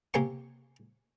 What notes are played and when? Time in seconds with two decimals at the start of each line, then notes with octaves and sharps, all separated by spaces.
0.14 C3 A#3 C4 G#5 C#6